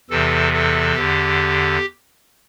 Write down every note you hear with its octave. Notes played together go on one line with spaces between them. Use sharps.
E2 C3 E3 A4
A4
E2 D3 G4